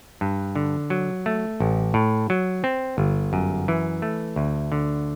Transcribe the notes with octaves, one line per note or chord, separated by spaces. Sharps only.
G2
D3
F#3
A3
A1
A2
F#3
C4
G1
F#2
E3
A3
D2
D3